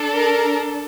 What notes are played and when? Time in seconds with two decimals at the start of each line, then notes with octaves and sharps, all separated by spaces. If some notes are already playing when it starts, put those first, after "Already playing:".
Already playing: D4 A4
0.14 A#4